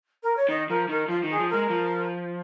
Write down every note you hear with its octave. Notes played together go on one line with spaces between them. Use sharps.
A#4
C#5
D#3 D#5
F3 A#4
D#3 A#4
F3 F4
D#3
G#4
F3
G#3 A#4
F3